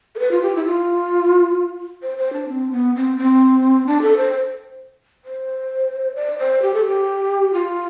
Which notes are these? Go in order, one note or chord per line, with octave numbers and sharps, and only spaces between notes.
A4
B4
F4
G4
E4
F4
C5
C5
D4
C4
B3
C4
C4
D4
A4
C5
C5
D5
C5
G4
A4
G4
F4